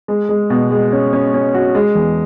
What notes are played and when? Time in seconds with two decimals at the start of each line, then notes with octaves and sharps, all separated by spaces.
0.08 G#3
0.29 G#3
0.50 B2
0.70 G#3
0.92 C#4
1.13 C#4
1.34 C#4
1.54 F#4
1.75 G#3
1.95 E2